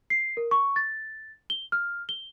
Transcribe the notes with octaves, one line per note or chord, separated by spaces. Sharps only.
C7
A#4
C#6
A6
G7
F6
G7